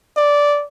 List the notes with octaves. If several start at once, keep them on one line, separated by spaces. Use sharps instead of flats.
D5